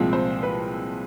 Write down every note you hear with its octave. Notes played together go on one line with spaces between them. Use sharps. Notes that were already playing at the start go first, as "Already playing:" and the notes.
Already playing: C2 A#2 F3 G#3 C4
C5
B4